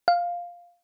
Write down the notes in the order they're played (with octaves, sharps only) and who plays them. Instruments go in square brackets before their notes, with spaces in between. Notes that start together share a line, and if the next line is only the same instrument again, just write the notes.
[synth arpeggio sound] F5